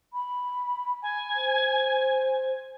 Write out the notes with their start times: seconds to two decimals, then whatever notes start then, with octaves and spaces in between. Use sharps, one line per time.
0.13 B5
1.02 G#5
1.35 C5